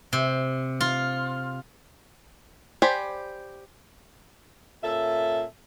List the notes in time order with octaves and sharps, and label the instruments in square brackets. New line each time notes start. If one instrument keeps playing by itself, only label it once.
[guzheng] C3
F4
[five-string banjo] G4 C5 D5 G#5 B5
[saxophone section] A#2 C#4 A4 E5